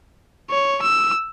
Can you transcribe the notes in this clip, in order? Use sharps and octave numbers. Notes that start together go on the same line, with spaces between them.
C#5
E6